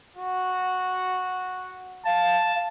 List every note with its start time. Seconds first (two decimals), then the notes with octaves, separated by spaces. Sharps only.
0.17 F#4
2.06 F5 A5